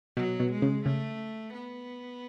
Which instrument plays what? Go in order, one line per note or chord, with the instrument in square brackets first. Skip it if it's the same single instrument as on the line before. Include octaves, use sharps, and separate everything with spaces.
[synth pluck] B2 [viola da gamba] F#3
[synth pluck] B2
[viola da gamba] G#3
[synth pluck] C#3
[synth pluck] C#3 [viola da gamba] A3
[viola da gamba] B3